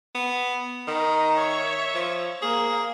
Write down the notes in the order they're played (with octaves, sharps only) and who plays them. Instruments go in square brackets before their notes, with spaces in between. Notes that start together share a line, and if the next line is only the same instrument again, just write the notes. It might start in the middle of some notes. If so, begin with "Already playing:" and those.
[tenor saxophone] B3
[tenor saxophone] D#3 [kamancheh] A#5
[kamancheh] C#5 E5
[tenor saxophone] F3
[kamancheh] A#3 [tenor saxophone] G#4